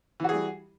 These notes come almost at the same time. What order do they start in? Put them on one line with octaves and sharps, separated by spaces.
E3 F#4 G#4 G3